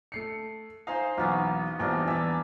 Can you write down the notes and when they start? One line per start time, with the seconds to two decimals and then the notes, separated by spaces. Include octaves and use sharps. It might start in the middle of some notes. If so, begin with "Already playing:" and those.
0.12 A3 C7 C#7
0.87 D#4 C5 F5 G#5 C6
1.17 B1 E2 A#3 B3 C#4
1.79 A#1 E2 G3 D4 D#4 A#4
2.07 E2 D5 E5